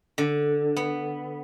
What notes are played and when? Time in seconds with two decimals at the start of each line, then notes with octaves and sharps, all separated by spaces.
0.18 D3
0.76 B3